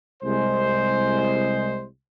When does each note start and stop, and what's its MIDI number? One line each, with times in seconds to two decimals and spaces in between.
0.23 1.84 36
0.23 1.84 56
0.23 1.84 72